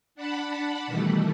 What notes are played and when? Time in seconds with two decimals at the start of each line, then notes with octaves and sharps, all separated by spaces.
0.15 D4 F#5 A5 B5
0.87 B2 D#3 E3 G3 A3